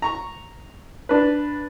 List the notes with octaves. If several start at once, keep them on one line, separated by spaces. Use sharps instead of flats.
A#5 C#6
D4 B4